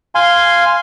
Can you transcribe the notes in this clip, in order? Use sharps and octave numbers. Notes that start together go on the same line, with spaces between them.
F5 G#5 C6